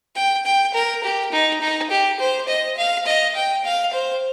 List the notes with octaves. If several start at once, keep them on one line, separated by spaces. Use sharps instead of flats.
G5
G5
A#4
G4
D#4
D#4
G4
C5
D#5
F5
D#5
G5
F5
C5